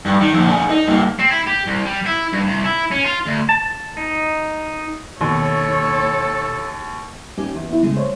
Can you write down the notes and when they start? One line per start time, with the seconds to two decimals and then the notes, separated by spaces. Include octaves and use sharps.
0.06 G2
0.21 D#3
0.33 F2 A#2
0.48 D4 G#4
0.70 D#4
0.88 G2 A#3
1.19 C4
1.31 E4
1.46 G4
1.66 C2
1.85 G3
2.06 E4
2.33 G2
2.47 C2
2.64 E4
2.91 C#4
3.04 F4
3.26 D2
3.49 A5
3.97 D#4
5.21 D#2 B2 A4 C#5
7.37 C#4 D#4 G4
7.54 E2
7.68 B3 E4
7.83 C#3 G#3 A3
7.97 C5 C#5